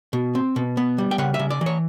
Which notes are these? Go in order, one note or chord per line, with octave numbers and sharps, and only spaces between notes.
B2
C4
B2
B3
G3
G5
C#3 F#5
E5
C#3
D5
E3
C#5